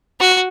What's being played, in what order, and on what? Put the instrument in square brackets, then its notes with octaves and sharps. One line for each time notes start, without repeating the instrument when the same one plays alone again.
[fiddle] F#4